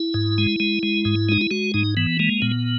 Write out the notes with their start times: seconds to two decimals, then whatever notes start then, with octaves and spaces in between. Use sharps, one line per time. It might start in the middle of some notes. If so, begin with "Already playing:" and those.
Already playing: E4
0.14 G#2
0.38 G#3
0.60 G#3
0.83 G#3
1.05 G#2
1.29 G#3 D#4
1.41 E4
1.51 G#3 F#4
1.74 G#2 D#4
1.97 E3 B3
2.19 G#3 A#3
2.42 A#2 B3